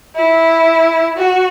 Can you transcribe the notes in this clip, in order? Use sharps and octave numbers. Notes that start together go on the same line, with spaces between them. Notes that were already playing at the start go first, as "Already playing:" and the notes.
E4
F#4